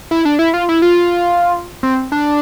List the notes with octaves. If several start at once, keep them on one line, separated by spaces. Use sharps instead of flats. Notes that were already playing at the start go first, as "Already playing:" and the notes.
E4
D4
E4
F4
E4
F4
C4
D4